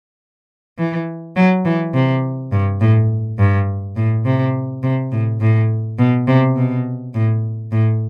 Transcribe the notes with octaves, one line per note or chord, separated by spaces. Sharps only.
E3
F#3
E3
C3
G2
A2
G2
A2
C3
C3
A2
A2
B2
C3
B2
A2
A2